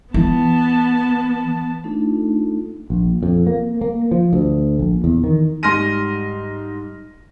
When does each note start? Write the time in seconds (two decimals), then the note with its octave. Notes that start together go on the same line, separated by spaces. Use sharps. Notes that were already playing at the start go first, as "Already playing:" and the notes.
0.14 E3 B3 A5
1.84 A3 D4 D#4 F4 A4
2.90 A#1
3.23 F2
3.47 A#3
3.81 A#3
4.11 F3
4.33 D2
4.79 A#1
5.04 E2
5.24 D#3
5.63 G#2 G3 C6 F6 A#6 D#7